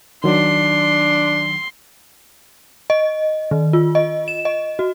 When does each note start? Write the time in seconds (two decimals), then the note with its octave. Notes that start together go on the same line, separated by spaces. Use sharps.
0.24 D#3 F#3 D4 C6
2.90 D#5
3.51 D#3
3.73 F4
3.95 D#5
4.28 E7
4.45 D#5
4.79 F#4